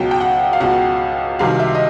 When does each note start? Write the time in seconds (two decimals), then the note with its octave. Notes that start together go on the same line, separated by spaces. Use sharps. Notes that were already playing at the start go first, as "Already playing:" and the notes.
Already playing: C#2 B2 F#3 G5
0.11 G5
0.21 F#5
0.53 F5
0.61 C#2 B2 F#3 F#5
1.39 C2 C3 D#3 F#3 F5
1.60 E5
1.75 D#5